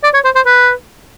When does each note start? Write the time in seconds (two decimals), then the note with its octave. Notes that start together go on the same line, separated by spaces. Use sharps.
0.04 D5
0.14 C#5
0.25 C5
0.36 C5
0.46 B4